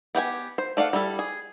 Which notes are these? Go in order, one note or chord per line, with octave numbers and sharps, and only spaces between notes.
B3 G4 F#5 G#5
C5
A3 D5 F5 F#5
G3 E4 A4
G#4